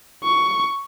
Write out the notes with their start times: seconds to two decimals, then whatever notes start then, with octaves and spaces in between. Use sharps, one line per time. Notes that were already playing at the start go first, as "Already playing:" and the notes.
0.24 C#6